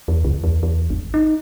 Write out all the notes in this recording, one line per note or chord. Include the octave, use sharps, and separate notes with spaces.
E2
C#2
E2
E2
G#1
D#4